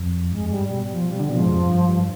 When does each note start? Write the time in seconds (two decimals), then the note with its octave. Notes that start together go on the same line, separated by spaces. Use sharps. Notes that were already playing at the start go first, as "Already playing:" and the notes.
Already playing: F2
0.31 G2 G#3
0.41 F2
0.51 G2 G3
0.61 G#2
0.71 B2 G3
0.91 F3
1.10 C3 G3
1.19 D3
1.30 B2 F3
1.39 G#2
1.49 F2
1.69 G2
1.89 G2